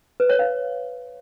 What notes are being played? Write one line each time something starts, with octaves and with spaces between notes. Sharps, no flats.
B4
C#5
F5